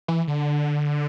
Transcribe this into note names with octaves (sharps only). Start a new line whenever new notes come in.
E3
D3